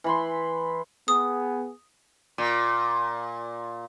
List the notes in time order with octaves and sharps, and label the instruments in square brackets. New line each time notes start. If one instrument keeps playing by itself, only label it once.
[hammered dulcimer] E3 B5 C6
[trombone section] B3 G#4 [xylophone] D#6
[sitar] A#2